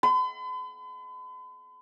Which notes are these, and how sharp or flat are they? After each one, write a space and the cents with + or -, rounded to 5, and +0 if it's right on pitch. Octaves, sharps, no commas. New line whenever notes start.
B5 +45